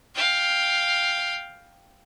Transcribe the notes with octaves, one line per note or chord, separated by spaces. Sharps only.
F5 G5